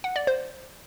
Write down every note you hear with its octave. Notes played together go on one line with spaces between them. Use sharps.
F#5
D5
C5